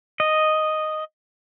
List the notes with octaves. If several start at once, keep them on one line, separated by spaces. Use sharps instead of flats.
D#5